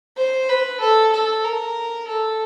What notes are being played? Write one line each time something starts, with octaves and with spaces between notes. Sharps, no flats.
C5
B4
A4
A4
A#4
A4